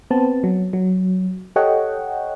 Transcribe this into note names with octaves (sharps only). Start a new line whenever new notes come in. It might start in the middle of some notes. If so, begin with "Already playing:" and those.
B3 C4 A5
F#3
F#3
G4 A4 C#5 D#5 F#5 G5